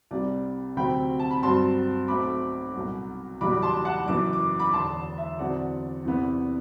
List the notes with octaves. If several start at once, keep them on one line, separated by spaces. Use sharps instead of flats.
C2 C3 G3 D5
D2 C3 F#3 C4 G5 B5
A5
B5
G2 F#3 C4 A5 C6
B1 B2 A3 C4 B5 D6
C2 B2 F#3
F#1 E2 B2 G3 B5 D6
A5 C6
F#5 A5
F#1 F#2 E3 B3 D6
D6
B5 D6
E1 E2 D3 A5 C6
E5
E2 D3 F#3 C4 D5 F#5
E2 C3 E3 B3